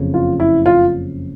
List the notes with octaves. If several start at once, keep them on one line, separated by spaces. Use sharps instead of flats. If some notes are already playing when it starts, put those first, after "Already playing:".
Already playing: F#1 F2 C#3
F4
E4
F4